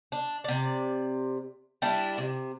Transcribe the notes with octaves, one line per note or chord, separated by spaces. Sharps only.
D4
C3 D5
G3 D4 E4
C3